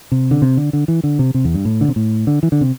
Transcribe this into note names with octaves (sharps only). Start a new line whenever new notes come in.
C3
D3
C3
D3
D3
E3
D3
C3
C3
E2
G2
A2
D3
C3
A2
D3
E3
D3
C3